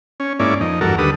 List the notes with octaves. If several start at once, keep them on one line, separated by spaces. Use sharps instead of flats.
C#4
G#2 A#3 C#4 E4 D5
F2 D#4
E2 G2 F#4 A4 A#4
D#2 D3 G3 A4 B4 D#6